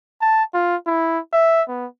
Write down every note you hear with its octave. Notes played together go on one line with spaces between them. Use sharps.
A5
F4
E4
E5
B3